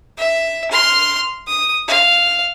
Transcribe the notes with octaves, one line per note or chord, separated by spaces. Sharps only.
E5
C6 F6
D#6
F5